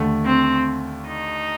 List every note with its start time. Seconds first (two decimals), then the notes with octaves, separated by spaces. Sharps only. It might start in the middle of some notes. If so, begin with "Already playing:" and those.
Already playing: D#2 D3 A3
0.26 C4
1.07 D#4